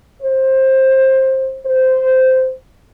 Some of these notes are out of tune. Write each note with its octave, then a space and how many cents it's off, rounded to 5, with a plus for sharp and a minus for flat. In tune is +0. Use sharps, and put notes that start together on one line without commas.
C5 +20
C5 -10